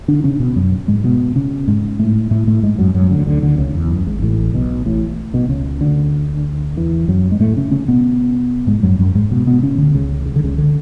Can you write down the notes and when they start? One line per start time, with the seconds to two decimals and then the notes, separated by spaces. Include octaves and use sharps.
0.08 D3 D4
0.24 C#3 C#4
0.40 B2 B3
0.56 F#2 F#3
0.88 G#2 G#3
1.04 B2 B3
1.35 C#3 C#4
1.68 G#2 G#3
1.99 A2 A3
2.31 A2 A3
2.47 A2 A3
2.63 G#2 G#3
2.78 F#2 F#3
2.94 F#2 F#3
3.10 D2 D3
3.27 D2 D3
3.43 D2 D3
3.58 C#2 C#3
3.75 E2
3.90 F#2
4.06 G#1 G#2
4.22 A1 A2
4.54 B1 B2
4.86 A1 A2
5.33 B1 B2
5.49 C#2 C#3
5.81 D2 D3
6.76 E2 E3
7.08 F#2 F#3
7.32 G#3
7.40 A2 A3
7.57 C#3 C#4
7.71 C#3 C#4
7.88 B2 B3
8.67 G#2 G#3
8.83 F#2 F#3
8.99 F#2 F#3
9.15 G#2 G#3
9.31 B2 B3
9.47 B2 B3
9.62 C#3 C#4
9.78 D2 D3
9.95 C#2 C#3
10.26 C#3
10.36 D3
10.44 C#2 C#3
10.58 D3